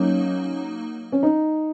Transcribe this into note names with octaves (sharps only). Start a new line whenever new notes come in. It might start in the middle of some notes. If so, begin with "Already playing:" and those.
Already playing: F#3 A#3 C#4 D#4
C#4
D#4